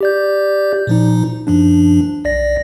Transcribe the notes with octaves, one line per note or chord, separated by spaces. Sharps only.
G4 D5 G6
A#2 F3 D#4
F#2 F3 D4
B1 D5 A#6